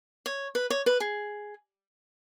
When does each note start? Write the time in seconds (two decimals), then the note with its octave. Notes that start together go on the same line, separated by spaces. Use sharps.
0.26 C#5
0.55 B4
0.70 C#5
0.86 B4
1.00 G#4